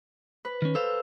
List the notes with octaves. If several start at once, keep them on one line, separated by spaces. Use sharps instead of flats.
B4
D#3 C#4
A4 C5 F5 E6